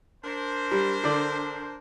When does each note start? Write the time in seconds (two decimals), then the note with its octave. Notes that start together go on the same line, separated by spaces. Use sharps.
0.24 D4 A#4 C5
0.71 G3
1.04 D3 D5